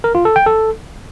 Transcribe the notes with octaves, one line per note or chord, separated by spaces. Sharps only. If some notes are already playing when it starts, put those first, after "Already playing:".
A#4
F4
A4
G5
A4